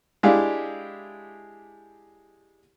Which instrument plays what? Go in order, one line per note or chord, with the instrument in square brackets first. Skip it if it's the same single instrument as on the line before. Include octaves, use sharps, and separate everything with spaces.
[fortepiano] G#3 D4 E4 G4 F5